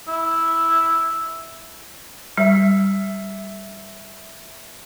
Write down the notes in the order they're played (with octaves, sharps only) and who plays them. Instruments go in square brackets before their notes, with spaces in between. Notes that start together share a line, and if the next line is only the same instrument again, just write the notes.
[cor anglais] E4
[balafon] G3 [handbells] E5